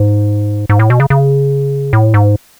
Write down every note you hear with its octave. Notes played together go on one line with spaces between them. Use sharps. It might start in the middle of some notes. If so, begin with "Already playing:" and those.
Already playing: G#2
G#2
A2
B2
C#3
C#3
A2
G#2